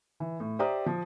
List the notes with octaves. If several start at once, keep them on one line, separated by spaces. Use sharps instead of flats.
E3
A2
G4 C5 D5 E5 A#5 D#6
F3